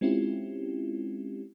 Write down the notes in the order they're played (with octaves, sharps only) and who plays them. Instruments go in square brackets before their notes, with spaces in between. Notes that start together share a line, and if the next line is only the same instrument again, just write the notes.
[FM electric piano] G#3 C4 C#4 E4 F4 G4